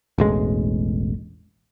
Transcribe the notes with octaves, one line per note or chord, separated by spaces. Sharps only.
E1 A1 G#3